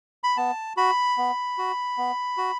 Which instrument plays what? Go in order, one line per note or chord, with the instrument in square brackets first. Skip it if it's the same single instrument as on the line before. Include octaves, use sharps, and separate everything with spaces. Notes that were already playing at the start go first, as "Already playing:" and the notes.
[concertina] B5
B3 A5
F#4 B5
B3
F#4
B3
F#4